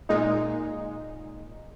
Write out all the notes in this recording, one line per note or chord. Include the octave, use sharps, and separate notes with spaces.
A#2 G#3 D#4